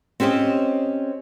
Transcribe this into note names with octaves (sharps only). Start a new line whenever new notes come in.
C4 C#4 G4 C5 D#5